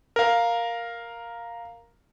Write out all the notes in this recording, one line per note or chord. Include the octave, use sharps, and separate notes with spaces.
A#4 F5